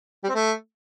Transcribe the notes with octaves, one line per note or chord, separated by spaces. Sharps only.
G3
C4
A3